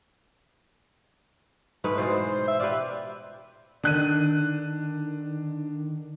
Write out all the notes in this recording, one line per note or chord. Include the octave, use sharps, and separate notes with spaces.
G#2 G#3 A3 B4
B2 E3 G#3 C5
E5
F4 G4 B4 D5
D3 D#3 D4 F#6 D#7